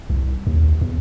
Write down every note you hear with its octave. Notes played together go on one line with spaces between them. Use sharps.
C2
D#2
E2